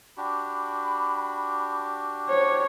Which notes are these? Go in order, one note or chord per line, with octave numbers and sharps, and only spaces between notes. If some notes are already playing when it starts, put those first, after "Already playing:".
D4 F#4 G4 B5
C5 C#5